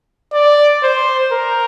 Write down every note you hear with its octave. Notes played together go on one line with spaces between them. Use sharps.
D5
C5
A#4